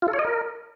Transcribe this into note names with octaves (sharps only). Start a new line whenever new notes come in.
F4
A4
C#5
D#5
A#4